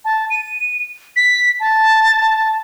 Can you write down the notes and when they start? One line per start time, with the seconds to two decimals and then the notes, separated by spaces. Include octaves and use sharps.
0.05 A5
0.30 D#7
1.16 B6
1.60 A5